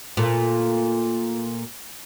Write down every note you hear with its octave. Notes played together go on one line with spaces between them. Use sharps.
A#2 A3